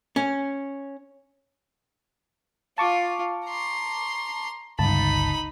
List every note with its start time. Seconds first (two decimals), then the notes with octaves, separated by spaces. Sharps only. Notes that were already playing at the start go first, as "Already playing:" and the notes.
0.16 C#4
2.78 F4 A5 C#6 D6
3.46 A#5 C6
4.79 G1 C#2 D#4 A5 B5